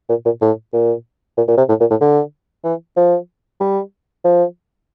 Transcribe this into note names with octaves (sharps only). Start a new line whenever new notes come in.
A#2
A#2
A2
A#2
A#2
A#2
C3
A2
A#2
A2
D3
E3
F3
G3
F3